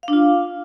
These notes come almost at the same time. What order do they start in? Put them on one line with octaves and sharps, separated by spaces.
F5 D4 F4